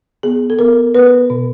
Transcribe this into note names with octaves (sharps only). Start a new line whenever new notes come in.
B3 G#4
A4
B3 A#4
B3 B4
B2